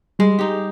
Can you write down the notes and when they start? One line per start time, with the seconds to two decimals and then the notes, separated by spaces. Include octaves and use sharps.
0.19 G3 G#3
0.39 D#4 G4